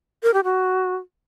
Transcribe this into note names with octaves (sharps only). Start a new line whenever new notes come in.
A#4
G4
F#4